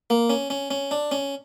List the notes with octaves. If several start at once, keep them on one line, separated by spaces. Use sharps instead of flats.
A#3
C#4
C#4
C#4
D4
C#4